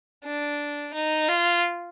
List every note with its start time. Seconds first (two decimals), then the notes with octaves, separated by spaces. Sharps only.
0.25 D4
0.94 D#4
1.28 F4